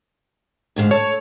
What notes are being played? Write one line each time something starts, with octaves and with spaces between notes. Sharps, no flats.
D2 G#2 F5
A4 C#5